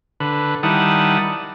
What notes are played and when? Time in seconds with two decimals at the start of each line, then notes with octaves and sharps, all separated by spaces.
0.20 D3 B4
0.63 D#3 G3 E4 F#5 A5 D#6